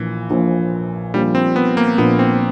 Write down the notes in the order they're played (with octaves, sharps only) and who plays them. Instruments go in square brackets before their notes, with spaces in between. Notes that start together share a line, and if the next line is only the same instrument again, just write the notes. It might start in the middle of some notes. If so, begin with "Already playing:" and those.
Already playing: [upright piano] A#1 A#2 F3 [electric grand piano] E3
[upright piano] A#1 A#2 F3
[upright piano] A#1 A#2 F3 [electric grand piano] G3
[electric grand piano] C4
B3
A#3
[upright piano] A#1 A#2 F3 [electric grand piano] B3
[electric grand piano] C4